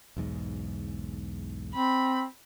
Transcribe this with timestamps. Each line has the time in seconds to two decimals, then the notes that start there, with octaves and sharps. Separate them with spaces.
0.16 B1 E2 G#2
1.74 C4 B5